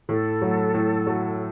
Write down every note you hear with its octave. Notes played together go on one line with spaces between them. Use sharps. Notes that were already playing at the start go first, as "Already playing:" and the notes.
A2 A4
F#3 A3 F#4
A2
F#3 A3 F#4